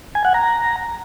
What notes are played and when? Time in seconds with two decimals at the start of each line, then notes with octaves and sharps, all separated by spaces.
0.15 G#5
0.25 F#5
0.34 A#5